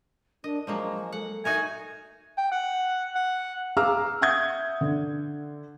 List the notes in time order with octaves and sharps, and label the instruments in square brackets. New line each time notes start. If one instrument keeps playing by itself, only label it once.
[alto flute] D4 [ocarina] A#4 [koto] D#5
[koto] F3 F#3 A#3 [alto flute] G#3 [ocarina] D#5
[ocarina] A4 [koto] F#5
[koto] D#4 F#4 A#4 [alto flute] E5 [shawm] G#5
[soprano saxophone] G5
F#5
F#5
[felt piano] G#4 F5 A#5 D6 E6 F6
E5 F#5 D#6 G6 G#6
D3